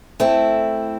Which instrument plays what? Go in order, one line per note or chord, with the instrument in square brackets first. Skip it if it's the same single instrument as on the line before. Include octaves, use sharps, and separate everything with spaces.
[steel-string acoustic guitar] A3 C4 E4